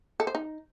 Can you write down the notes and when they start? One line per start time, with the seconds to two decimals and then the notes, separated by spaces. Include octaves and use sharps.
0.20 A4
0.27 C5
0.35 D#4